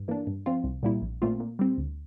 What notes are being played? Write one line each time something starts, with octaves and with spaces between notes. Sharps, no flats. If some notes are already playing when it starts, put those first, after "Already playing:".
Already playing: G2
E3 A#3 D4
G2
F3 C4 F4
C2
A#2 G3 A#3 E4
A#1
A#2 A3 C4 F4
A#2
G3 C4
D2